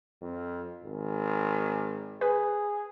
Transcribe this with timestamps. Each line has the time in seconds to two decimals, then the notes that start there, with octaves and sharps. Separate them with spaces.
0.21 F2
0.82 G#1
2.21 G#4 B4